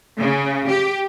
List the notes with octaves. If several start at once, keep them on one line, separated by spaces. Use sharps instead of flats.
C#3
G4